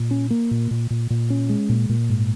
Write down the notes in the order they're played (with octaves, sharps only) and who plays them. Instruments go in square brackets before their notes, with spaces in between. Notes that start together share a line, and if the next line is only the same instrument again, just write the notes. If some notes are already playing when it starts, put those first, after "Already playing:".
Already playing: [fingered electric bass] A#2
C#4
A#3
A#2
A#2
A#2
A#2
C#4
G#3
A#2
A#2
G#2